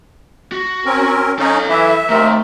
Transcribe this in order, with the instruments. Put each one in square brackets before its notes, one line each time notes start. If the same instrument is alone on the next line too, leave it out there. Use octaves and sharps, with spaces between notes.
[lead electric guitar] F#4
[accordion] C4 C#4 A#4
[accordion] C#4 D#4 [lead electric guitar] A4 F5
[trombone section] E3 [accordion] E5
[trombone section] D#2 C3 A#4 [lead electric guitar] A3